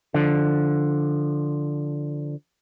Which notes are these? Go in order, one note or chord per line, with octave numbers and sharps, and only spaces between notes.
D3 F3